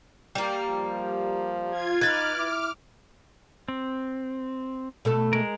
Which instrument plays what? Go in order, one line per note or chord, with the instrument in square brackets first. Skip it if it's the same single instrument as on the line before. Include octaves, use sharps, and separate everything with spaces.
[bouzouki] G3 A#3
[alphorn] F3
[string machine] F4 G#6
[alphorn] D#4 [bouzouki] B4 [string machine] D6 F6 [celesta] G#6 A6
[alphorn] E4
[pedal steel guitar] C4
[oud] B2 A3 A4
[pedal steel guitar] G#3 A#4